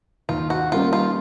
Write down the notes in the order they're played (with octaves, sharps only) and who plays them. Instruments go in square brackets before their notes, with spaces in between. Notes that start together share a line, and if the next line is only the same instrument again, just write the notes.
[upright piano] D#2 [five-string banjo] F4
[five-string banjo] F#4
[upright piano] D#3 G3 A#3 C#4 [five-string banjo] F4
[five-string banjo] F4